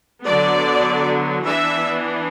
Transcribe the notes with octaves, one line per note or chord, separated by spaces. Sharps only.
D3 F#3 B3 D5
E3 B3 D4 E5